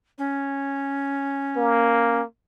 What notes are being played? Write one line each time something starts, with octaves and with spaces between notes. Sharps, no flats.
C#4
A#3